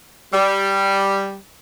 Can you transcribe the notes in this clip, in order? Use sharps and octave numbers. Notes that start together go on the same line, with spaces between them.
G3